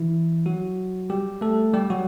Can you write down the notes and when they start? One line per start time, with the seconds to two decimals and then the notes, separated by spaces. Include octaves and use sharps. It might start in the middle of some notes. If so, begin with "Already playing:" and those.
Already playing: E3 E4
0.46 F#3 F#4
1.10 G3 G4
1.41 A3 A4
1.74 G3 G4
1.90 F#3 F#4